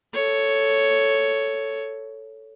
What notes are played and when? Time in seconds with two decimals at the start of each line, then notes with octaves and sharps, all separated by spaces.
0.14 A4 C#5